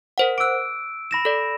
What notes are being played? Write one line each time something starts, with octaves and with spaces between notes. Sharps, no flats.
A#4 C5 F#5
D6 E6 F#6 D7
B5 A#6 E7
A4 D5